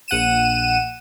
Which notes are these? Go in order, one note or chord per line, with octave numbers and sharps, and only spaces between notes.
A#1 F#5 D#7 E7